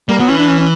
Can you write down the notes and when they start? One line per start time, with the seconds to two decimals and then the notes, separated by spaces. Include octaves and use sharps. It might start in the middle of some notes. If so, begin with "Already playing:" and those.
0.08 G3 A#3
0.19 F#3 B3
0.28 E3 C#4
0.38 D4
0.48 C#4
0.59 C#4